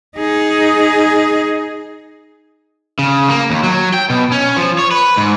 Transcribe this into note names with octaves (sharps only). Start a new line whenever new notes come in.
D#4 G#4
C#3
A#3
D#2
F#3
G5
B2
C#4
F3
C#5
B4
G#2